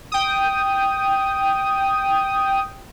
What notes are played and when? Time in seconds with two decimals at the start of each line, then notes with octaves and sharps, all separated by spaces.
0.12 G5 D#6